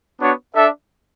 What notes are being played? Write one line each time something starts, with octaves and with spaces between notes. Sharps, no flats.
B3 D4 F#4 C#5
D4 A4 E5